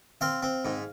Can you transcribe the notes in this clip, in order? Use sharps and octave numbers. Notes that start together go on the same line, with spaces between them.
C4 F5
C4
G#2